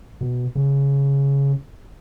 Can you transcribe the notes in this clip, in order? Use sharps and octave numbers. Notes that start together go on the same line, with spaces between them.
B2
C#3